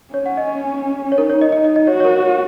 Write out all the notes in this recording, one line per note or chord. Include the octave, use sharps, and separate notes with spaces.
C#4 C#5
F#5
D#5
C#5
D#4 A#4
C#5
D#5
D#4 D#5
D#5
D#5
F#4 C#5
C#5
A#4
C#5